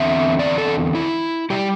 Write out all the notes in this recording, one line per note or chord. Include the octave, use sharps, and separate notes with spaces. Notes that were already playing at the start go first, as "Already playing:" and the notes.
Already playing: E2 D3 C4 E5
D5
A4
E4
C3 G3 G4